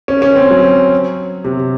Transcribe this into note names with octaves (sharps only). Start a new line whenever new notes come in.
C#4
C#4
C4
F#3
C3